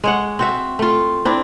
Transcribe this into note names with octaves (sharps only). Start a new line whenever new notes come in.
G#3 C#5 F#5
C4 F#4 E5
A3 F4
C4 D4 E4